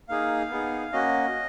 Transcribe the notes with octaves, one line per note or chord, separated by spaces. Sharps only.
A#3 D#4 G#4 F5
B3 D#4 G#4
A#3 C#4 F#4 D#5